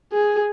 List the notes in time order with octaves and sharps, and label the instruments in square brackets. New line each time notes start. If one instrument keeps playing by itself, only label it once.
[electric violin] G#4